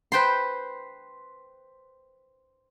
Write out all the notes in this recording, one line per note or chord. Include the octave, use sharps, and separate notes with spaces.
B4 C5 G5 A5 C6